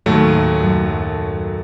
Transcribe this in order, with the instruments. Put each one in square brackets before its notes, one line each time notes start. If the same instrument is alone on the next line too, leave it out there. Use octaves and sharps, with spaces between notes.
[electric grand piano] D#2 F#3 A3 [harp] A2
[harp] D#6 D7 D#7
F#2
A4